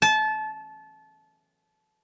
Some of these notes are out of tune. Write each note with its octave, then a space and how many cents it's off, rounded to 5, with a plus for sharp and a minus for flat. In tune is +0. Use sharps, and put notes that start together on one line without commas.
A5 -25